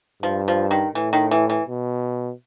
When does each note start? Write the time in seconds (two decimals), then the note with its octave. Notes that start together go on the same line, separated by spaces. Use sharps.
0.23 G2 F3
0.48 F3
0.71 D#3
0.95 A2 E3
1.13 D#3
1.31 E3
1.50 E3
1.67 B2